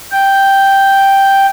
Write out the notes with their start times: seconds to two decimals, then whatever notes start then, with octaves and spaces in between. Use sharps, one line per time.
0.12 G5